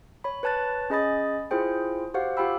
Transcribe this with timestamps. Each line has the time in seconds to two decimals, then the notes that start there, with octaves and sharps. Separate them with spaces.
0.24 C#5 B5
0.43 B4 C#5 A5 F#6 A6
0.90 C#4 G#4 D#5 B5 D#6 A6
1.51 E4 F4 G#4 C5 G5
2.14 F#4 G4 C5 F5 F#5
2.37 F4 G4 F5 G5 B5 E6